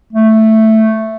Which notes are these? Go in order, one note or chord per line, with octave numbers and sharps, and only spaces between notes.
A3